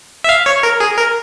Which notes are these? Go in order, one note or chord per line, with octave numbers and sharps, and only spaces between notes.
E5
F5
C#5
A#4
G#4
A#4